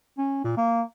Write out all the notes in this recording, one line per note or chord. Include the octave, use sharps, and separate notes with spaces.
C#4
A#2
A#3